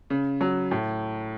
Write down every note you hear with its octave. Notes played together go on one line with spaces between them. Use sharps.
C#3
F#3
A2